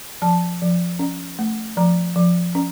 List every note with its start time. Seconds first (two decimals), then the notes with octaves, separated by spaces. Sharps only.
0.22 F3 A5
0.62 F3
0.99 C#4
1.39 A3
1.77 F3 A#5
2.16 F3
2.55 C#4